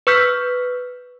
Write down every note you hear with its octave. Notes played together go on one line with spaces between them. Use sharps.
B4 C#6 E6 F6 G6 B6